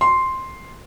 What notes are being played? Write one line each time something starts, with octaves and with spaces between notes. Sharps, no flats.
C6